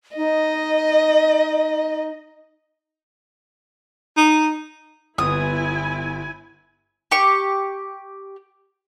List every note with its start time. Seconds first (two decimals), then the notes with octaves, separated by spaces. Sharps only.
0.16 D#4 D#5
4.17 D#4
5.18 G1 B3 E4 G#5 D#6
7.11 G4 C#6